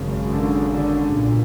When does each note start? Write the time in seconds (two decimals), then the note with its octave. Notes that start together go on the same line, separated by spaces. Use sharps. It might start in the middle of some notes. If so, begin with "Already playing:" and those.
Already playing: G#1 F#2 C#3
0.32 D3
0.71 D3
1.12 B1 A#2